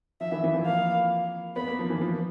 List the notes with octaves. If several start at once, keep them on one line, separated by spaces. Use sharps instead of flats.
F3 E5
E3
E3
F3
A#3 F5
B3 B5
A#3
F3
E3
F3